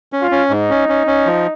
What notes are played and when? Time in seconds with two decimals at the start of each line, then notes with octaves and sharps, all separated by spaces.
0.13 C#4
0.22 F4
0.31 C#4
0.50 G#2 D#4
0.70 C#4
0.89 C#4
1.07 C#4
1.26 F3